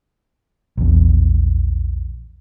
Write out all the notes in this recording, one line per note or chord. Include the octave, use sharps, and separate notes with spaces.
A#1 E2